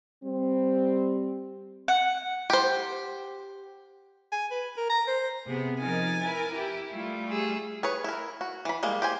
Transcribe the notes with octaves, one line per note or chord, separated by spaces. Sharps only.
G3 C4
F#5
G4 C5
G#5
B4
A#4
A#5
C5
C3 B3 G#4
F3 D#4 A#4 G#5 A6
E4 A#4 B4
E4 G4
G3 A3 F4
G4 G#4 E6
G#4 B4 C#5
E4 A#4
F#4
E3 B5
G3 G#3 A#3
G4 C5 G#5